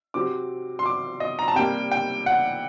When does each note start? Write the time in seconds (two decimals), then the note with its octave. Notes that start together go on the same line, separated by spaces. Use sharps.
0.14 C3 F#3 C4 D6
0.79 C6
0.86 D6
1.20 D#5
1.39 A#5
1.48 A5
1.55 C3 G3 A#3 G5
1.91 G5
2.26 F#5